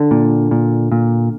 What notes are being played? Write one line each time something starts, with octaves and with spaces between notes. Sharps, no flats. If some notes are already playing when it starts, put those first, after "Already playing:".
Already playing: D3
A#2
A#2
A#2